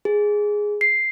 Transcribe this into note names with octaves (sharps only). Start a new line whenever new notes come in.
G#4
C7